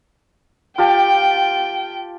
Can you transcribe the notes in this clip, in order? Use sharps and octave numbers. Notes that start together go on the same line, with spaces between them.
F4 G4 G5 A5